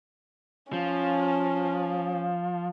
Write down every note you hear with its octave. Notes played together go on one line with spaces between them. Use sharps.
F3 C#4